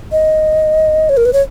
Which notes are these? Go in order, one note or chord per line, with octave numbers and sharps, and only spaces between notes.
D#5
C#5
A#4
B4
C#5